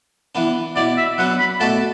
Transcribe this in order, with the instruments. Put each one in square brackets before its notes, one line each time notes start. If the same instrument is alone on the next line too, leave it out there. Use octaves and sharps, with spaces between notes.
[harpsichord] E3 B3 D4
[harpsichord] B2 B3 E4 [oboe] D5
[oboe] E5
[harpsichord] F#3 B3 D4 B4 [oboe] F#5
[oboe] B5
[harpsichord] B2 A3 F#4 A4 D5 [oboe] A5